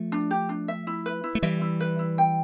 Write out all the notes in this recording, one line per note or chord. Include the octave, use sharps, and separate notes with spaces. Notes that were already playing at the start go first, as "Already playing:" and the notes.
Already playing: F3 A3
D4
G4
D4
E5
E4
B4
E4
A3
E3 G3 E5
E4
B4
E4
G5